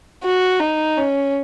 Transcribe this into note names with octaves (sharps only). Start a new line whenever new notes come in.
F#4
D#4
C#4